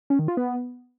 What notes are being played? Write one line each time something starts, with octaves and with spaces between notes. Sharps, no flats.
C#4
D#3
F4
B3